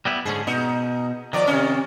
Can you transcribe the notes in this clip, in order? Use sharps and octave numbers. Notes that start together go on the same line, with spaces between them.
G3 B3 E4
G#2 D3 C#4 G#4
B2 D#4
D#3 F3 D5
C3 C#4